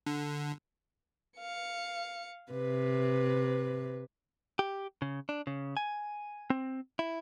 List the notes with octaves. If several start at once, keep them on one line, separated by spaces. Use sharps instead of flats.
D3
F5 C#7
C3 B4
G4
C#3
D4
C#3
G#5
C4
E4